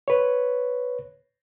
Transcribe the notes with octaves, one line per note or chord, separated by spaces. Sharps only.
B4 C#5